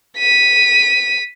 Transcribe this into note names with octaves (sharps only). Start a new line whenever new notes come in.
B6 D#7